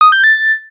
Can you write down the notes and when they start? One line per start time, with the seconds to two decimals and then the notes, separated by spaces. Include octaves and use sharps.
0.01 D#6
0.12 G6
0.24 A6